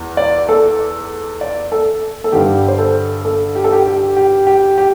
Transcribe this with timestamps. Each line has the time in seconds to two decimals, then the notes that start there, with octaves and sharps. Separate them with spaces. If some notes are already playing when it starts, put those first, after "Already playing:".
Already playing: E2
0.17 D5
0.49 A4
1.41 D5
1.72 A4
2.24 A4
2.32 G2 D3 G4
2.68 C5
2.78 A4
3.25 A4
3.55 G4
3.64 A4
3.73 G4
3.86 G4
4.17 G4
4.47 G4
4.78 G4